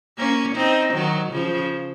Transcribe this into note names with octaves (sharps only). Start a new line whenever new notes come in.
A#3 C#4
C4 D#4
D#3 F#3
C#3 F3